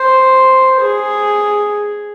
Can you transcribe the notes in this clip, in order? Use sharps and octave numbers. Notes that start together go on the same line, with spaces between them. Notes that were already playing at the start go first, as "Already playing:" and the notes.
Already playing: C5
G#4